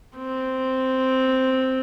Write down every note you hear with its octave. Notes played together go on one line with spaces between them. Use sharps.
C4